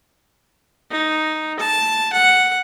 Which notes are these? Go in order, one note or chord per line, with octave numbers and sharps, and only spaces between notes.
D#4
A5
F#5